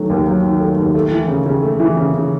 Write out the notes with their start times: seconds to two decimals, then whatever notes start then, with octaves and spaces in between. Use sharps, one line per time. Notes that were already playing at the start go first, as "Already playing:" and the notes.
Already playing: D#3 F#3 A3
0.10 D#2
0.26 F#3
0.43 D#3
0.60 A3
0.78 D#2
0.95 A3
1.11 E3
1.28 C#3
1.46 C#3
1.62 A3
1.80 E3
1.97 C#3
2.14 C#3